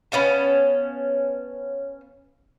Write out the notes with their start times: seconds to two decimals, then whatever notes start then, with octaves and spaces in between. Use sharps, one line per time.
0.12 B3 C#4 F5 A5